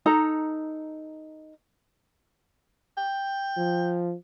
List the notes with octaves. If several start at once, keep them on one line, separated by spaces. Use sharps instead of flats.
D#4 A4 A#5
G5
F3